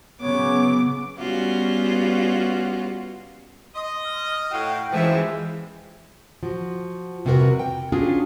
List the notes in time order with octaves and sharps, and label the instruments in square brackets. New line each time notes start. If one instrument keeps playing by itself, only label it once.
[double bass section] C#3 F#3 B3 [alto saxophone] C#5 [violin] D6
[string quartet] G3 B3 C#4 F4 F#4
[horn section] D#5 [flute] C6
[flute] F6
[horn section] A2 F#4 F5 [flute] G5
[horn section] F#2 F3 E5 [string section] E3 G#3
[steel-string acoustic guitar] F3 F#4
F2 C3 G3 F#4 A#4 B4
G5
C#4 D4 F4 F#4 G#4